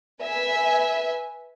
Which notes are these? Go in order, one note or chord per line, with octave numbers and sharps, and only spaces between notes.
B4 E5 G#5